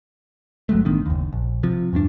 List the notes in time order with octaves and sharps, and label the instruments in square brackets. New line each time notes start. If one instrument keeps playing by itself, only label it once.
[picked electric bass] G1 F#3 G#3 A3
A1 D#3 B3 D4
F#1 D#2
A#1
C3 F3
E2 G2 C#4 D4